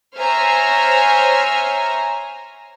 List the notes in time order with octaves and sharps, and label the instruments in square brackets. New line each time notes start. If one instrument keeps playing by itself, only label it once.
[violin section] C5 C#5 E5 G#5 A#5 F6